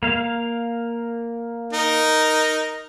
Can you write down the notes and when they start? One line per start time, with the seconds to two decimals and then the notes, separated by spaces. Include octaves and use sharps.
0.03 A#3 F5
1.73 D#4 A#4